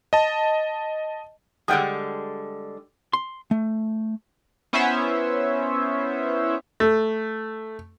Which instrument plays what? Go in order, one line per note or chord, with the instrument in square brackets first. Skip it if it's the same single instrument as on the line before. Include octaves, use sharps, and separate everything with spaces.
[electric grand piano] D#5 A5
[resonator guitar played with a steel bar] D3 G3 G#3 [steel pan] F#5 G5 D#6
[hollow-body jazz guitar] C6
A3
[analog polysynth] B3 C#4 E4 C5 C#5 E5
[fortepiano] A3